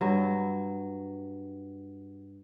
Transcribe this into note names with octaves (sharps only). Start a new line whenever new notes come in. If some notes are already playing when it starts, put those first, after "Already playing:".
G2 F#3